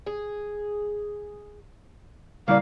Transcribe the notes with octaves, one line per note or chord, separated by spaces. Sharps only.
G#4
A2 C#3 G3 A#3 E4 D5 F5